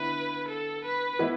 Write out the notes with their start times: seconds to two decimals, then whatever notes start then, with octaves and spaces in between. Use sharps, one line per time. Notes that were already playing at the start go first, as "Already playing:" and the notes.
Already playing: D3 B3 E4 B4
0.48 A4
0.84 B4
1.19 E3 B3 E4